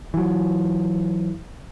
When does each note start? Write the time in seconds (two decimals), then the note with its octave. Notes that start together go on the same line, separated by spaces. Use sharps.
0.14 E3 F#3